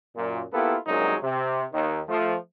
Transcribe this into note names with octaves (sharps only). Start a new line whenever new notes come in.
F#2 A#2
A#3 B3 E4 F4 G4 A4
C2 F#2 F#3 G#3 A#3 D#4
C3
D#2 D#3
F3 A3